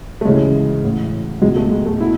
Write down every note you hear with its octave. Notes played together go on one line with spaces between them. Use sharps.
A3
D2 C#3 E3 G#3
A1 A2 E3
C#2 B2 G#3
A3
G#3
A3
B2 E4